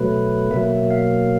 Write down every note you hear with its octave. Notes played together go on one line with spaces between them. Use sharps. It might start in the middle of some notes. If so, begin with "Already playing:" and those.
Already playing: B2 F#3 A3 B4
B2 F#3 A#3 E5
F5